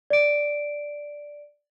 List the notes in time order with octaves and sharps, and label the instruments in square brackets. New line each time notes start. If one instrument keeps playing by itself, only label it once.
[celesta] D5 D7